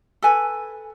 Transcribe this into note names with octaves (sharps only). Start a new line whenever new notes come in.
A4 B4 G#5